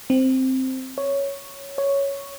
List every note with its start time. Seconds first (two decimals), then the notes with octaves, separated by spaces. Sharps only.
0.10 C4
0.98 C#5
1.78 C#5